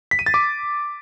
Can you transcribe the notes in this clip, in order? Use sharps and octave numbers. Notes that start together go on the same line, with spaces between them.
B6
D#7
A6
D6